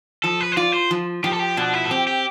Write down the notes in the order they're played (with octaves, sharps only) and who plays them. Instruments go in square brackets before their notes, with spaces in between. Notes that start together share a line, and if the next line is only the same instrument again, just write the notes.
[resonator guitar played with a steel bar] F3 [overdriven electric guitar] A4
[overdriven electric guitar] B4
C5
[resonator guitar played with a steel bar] F4 [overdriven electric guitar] D5
[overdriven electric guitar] C5
[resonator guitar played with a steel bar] F3
[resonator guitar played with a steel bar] F3 [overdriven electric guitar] G4
[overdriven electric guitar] A4
G4
[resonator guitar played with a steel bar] B2 [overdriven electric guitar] D4
[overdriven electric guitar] E4
A4
[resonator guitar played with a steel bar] C4 [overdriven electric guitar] G4
[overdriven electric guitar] G4